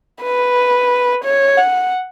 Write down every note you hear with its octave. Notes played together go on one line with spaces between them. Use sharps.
B4
C#5
F#5